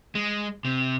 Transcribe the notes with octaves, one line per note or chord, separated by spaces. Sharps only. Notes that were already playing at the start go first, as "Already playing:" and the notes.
G#3
C3